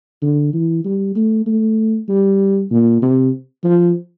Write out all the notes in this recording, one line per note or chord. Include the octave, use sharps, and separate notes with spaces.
D3
E3
G3
A3
A3
G3
A#2
C3
F3